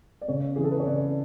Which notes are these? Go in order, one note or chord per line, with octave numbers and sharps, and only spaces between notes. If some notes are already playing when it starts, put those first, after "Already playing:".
D5
C#3 C#5
E3 G#4
A4
B4
C#5
C#3 D5